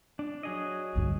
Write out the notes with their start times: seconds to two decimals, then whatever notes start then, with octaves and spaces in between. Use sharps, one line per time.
0.19 D4
0.43 F#3 G#4 D#5
0.95 D2 G2